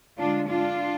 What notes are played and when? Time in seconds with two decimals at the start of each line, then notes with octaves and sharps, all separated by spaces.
0.18 D3 G#3 D4 F4
0.48 D4 F4